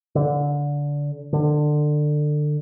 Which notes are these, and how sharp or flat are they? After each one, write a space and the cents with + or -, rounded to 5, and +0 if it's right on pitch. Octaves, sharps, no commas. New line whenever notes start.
D3 -20
D3 +25